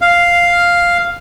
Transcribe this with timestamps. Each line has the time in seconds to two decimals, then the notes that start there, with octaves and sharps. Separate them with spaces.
0.01 F5